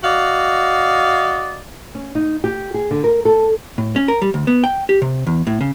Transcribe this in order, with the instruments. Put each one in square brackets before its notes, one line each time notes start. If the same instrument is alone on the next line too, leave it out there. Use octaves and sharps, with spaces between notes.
[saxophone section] F#4 D5 D#5 F5
[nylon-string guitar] C#4
D#4
G4
G#4
D3
A#4
A4
[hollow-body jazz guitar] A2
C#4
A#4
G3
D2
B3
G5
G4
C3
E2
A2
C#3